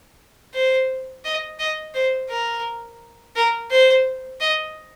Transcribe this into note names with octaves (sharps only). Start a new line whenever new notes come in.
C5
D#5
D#5
C5
A#4
A#4
C5
D#5